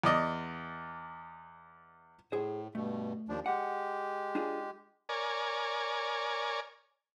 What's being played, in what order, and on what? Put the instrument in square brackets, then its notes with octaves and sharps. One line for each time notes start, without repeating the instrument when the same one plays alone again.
[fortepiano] E2 D5 D#5
[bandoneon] A2 [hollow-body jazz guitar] G#4 C5
[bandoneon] G2 B2 [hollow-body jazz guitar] A3
[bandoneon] D#2 F3 D4
[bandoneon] G#3 G4 [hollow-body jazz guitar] F#5
[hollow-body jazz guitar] D4 F4 G#4
[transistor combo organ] A#4 C#5 D5 G#5